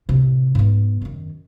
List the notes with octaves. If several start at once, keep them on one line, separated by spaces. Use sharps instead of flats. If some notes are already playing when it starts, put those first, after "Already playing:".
A2 C3
G#2 B3
F#2 D#3